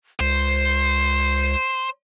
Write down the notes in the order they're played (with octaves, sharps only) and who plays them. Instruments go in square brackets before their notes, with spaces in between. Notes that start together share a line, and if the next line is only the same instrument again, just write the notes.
[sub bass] C#2 [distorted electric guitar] C5 [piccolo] C7